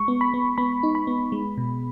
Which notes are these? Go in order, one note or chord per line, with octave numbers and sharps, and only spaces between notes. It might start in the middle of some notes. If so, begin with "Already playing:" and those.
Already playing: G#3 C#6
B3
B5
B3
B3 B5
D#4
B5
B3
G#3
B2